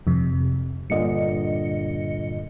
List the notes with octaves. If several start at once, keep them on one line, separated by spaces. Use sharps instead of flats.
F2 C3
G2 A#2 D3 D#5 C#7